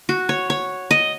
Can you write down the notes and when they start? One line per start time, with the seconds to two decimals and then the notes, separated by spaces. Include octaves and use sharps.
0.09 F#4
0.29 C#5
0.50 C#5
0.91 D#5